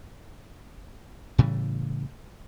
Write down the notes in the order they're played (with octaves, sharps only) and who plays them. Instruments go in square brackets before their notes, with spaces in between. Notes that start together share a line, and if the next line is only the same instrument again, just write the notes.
[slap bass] A2 C#3 E3 G3